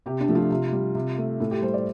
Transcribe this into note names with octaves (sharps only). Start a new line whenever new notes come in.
C3 G4
D4
F3 A3
F4
C3
G3
C3
A3
A2 A4
G4
G3 C5
D5